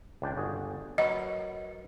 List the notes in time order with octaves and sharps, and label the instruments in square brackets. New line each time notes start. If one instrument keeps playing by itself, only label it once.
[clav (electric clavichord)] C#2 D4 G5
G1 F#4 G#4
[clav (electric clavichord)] F#3 A#4 B4 [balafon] D#5